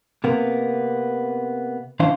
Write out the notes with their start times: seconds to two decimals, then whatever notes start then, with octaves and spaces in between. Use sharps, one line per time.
0.24 C3 A#3 B3
2.00 D#3 E3 C#4 D4 C5 F5